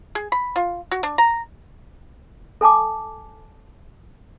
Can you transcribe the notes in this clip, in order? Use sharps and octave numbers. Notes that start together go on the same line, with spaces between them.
G#4
B5
F4
F#4
D4
A#5
A4 G#5 A5 D6